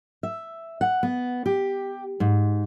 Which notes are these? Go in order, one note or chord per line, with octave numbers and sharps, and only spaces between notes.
E5
F#5
B3
G4
G#2